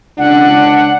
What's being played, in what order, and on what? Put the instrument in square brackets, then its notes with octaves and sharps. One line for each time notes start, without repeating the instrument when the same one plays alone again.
[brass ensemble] C#2 D4 [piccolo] F#5